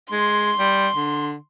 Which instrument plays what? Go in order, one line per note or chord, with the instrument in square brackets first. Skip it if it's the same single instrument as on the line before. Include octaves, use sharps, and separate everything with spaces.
[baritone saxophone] G#3 [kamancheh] C6
[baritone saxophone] G3
D3